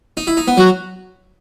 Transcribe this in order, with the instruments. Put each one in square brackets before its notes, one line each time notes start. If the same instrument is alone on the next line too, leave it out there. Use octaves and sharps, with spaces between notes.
[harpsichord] D#4
E4
D#4
B3
[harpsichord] F#3 [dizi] F#4